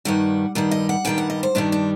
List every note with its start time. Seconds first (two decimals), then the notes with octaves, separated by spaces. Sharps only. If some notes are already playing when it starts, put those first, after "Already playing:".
0.05 G2 D#3 G3 F#5
0.55 G2 D#3 G3 F#5
0.71 D#5
0.89 F#5
1.05 G2 D#3 G3 G5
1.18 F#5
1.30 D#5
1.43 C5
1.55 G2 D#3 G3 D4
1.72 D4